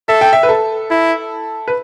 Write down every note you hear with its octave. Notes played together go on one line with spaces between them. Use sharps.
A4 E5
G5
E5
B4
A4
E4
B4